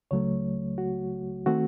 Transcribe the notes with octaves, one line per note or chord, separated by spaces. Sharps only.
C#2 C#3 F#3 A3 C#5
F#4
D#3 A3 C4 F#4